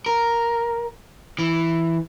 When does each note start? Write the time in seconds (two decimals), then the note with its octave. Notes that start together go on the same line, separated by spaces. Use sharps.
0.06 A#4
1.39 E3